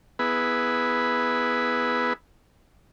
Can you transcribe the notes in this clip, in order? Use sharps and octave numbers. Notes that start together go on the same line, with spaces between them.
B3 E4 G#4 B4